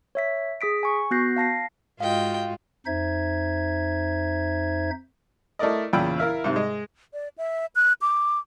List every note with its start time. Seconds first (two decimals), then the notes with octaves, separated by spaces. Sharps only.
0.15 C#5 E5 B6
0.61 G#4 D#6 B6 D7
0.83 G#5 C#6
1.11 B3 F#4 F#6 G6 A#6 C7
1.36 F5 A5 A#6 C7
2.00 G#2 F4 F#4 D#5 F5 G5
2.86 F2 D#4 C5 E5 G#6
5.59 A3 E4 A#4 D5 D#5
5.93 E2 A#2 C#3 G5 B5 E6
6.18 E4 A#4 E5 F5
6.44 G#2 C3
6.56 G#3 D#5
7.14 D5
7.38 E5
7.76 F#6
8.02 D6